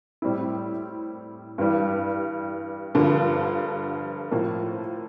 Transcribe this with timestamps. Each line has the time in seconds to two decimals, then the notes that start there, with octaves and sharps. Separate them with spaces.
0.22 A2 G3 C4 E4
1.58 G2 E3 G3
2.95 G2 D3 F3 A#3
4.31 A2 F3 A#3